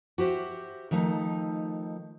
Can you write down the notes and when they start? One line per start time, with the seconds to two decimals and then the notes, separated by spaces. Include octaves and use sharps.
0.18 F#4 G4 C5 E5
0.91 D#3 F3 A3 D#4